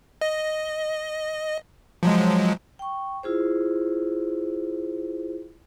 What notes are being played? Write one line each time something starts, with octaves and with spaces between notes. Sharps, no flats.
D#5
F3 F#3 G#3
G5 C#6
E4 F4 G#4 C5